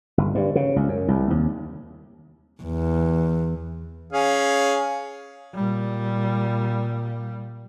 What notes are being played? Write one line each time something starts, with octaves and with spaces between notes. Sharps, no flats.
G1
G2
C#3
C#2
F#2
C2
D#2
E2
C#4 G#4 F5
A#2 G3